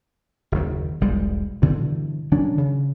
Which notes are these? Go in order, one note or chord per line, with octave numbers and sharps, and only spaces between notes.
F#1 D#2
E1 B1 G3 G#3
G2 B2 D3 E3
D#3 F#3 C#4 D4
C#3